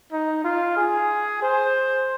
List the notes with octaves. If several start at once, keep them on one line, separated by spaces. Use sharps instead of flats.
D#4
F4
G#4
C5